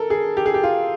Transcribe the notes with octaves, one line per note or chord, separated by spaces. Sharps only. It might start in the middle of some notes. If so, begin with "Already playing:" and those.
Already playing: A4 A#4
G#4
G4
G#4
G4
F4